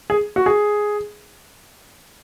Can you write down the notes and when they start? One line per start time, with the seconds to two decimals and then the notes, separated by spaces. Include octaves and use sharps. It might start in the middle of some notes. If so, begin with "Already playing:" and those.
0.10 G#4
0.36 F#4
0.46 G#4